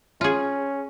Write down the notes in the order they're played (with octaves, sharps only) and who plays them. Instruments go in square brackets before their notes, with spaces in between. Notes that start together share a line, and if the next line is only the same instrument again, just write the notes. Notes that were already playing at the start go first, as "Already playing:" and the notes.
[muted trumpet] C#4 [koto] F4 G#4